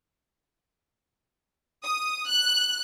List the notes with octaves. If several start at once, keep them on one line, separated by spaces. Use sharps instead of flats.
D#6
F#6